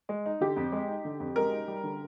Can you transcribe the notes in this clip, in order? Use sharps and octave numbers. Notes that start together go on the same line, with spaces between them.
G#3
D#4
D3 G4
F2
G#3
D#4
D3
F2
G#3 A#4
D#4
G3
D3